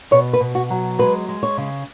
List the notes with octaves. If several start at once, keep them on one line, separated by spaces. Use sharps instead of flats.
B2 C#5
B4
B2
F#4
F#3
G#3 B4
G#3
C#5
C#3